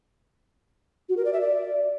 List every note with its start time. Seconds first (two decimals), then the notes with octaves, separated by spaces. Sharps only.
1.09 F#4
1.17 A#4
1.25 D5
1.33 E5
1.41 D5